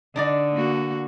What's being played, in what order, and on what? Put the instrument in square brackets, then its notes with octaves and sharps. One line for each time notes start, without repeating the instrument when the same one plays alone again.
[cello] D3 [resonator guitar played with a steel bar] D4 D#4 D5
[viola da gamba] A#3 F#4